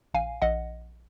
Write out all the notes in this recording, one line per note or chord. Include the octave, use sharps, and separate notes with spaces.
A#1 F5 G#5
A#1 D#5 F#5